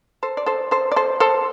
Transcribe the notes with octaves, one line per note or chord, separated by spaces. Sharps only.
A4 C5
D5
A4 C5
A4 C5
D5
A4 C5
A4 C5